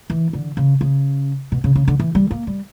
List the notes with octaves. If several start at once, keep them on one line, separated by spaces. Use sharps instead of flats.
E3
D3
C#3
C#3
B2
C#3
C#3
D3
E3
G3
A#3
G3